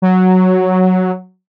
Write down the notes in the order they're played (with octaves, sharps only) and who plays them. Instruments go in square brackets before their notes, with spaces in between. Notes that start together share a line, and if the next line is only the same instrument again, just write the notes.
[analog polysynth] F#3